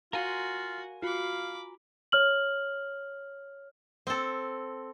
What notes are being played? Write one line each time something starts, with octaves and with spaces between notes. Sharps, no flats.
F4 F#4 A#4 F5 G#5 C6
F4 F#4 F5 B5 D6
C#5 F6 F#7
C4 A4